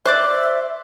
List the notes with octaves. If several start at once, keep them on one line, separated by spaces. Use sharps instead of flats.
C5 D5 E5 D6 F#6